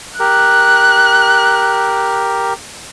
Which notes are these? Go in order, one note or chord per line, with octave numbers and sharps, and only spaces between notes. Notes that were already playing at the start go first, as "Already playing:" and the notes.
G4 A#4 F#6